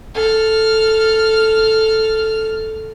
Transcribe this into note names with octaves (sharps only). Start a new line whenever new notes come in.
A4 F6